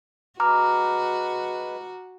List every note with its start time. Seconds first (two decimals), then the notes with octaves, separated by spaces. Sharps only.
0.40 G#3 F#4 B4 A#5 D6 F6